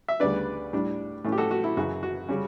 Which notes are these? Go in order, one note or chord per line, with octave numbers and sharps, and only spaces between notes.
E5
D2 C#3 G3 B3 D4 B4 D5
A2 G3 D4
A2 E3 A3 C#4
G4
F#4 A4
F#4
E4
F#2 C#3 E3 F#4
F#4
C#3 G3 C#4